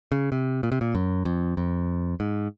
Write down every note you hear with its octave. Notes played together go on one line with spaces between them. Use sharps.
C#3
C3
A#2
C3
A#2
F#2
F2
F2
G#2